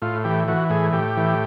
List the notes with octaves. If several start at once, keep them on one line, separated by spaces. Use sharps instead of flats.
A2 F4
E3 G4
E3 F#4
A2 G#4
A2 G4
E3